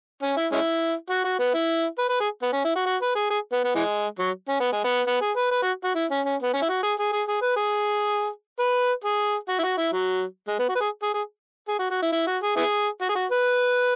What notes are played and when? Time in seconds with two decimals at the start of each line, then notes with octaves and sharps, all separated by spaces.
0.22 C#4
0.37 E4
0.52 G#3 C#4 E4
1.10 F#4
1.24 F#4
1.39 B3
1.54 E4
1.98 B4
2.09 B4
2.20 G#4
2.42 B3
2.53 C#4
2.65 E4
2.75 F#4
2.86 F#4
3.02 B4
3.15 G#4
3.30 G#4
3.52 B3
3.64 B3
3.75 E3 G#3
4.19 F#3
4.48 C#4
4.60 B3
4.72 G#3
4.84 B3
5.07 B3
5.21 G#4
5.36 B4
5.51 B4
5.63 F#4
5.84 F#4
5.95 E4
6.10 C#4
6.25 C#4
6.42 B3
6.53 C#4
6.62 E4
6.69 F#4
6.83 G#4
6.99 G#4
7.12 G#4
7.28 G#4
7.42 B4
7.56 G#4
8.60 B4
9.04 G#4
9.49 F#4
9.59 E4
9.63 F#4
9.78 E4
9.92 F#3
10.48 G#3
10.59 B3
10.69 F#4
10.75 B4
10.81 G#4
11.03 G#4
11.14 G#4
11.68 G#4
11.79 F#4
11.90 F#4
12.02 E4
12.12 E4
12.27 F#4
12.43 G#4
12.56 B3 E4 G#4
13.01 F#4
13.09 G#4
13.15 F#4
13.31 B4